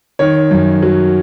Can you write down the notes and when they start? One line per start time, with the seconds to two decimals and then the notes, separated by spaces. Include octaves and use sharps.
0.19 D#3 C#5
0.51 F#2
0.82 F#3